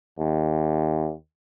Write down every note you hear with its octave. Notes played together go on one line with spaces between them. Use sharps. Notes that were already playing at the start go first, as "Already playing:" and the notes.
D#2